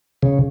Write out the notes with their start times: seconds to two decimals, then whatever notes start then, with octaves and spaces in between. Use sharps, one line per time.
0.23 C#3